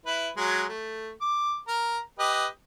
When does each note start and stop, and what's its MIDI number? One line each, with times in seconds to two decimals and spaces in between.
0.06 0.29 64
0.06 0.29 71
0.37 0.65 54
0.37 0.65 56
0.69 1.10 57
1.21 1.58 86
1.68 1.99 70
2.19 2.46 67
2.19 2.46 71
2.19 2.46 75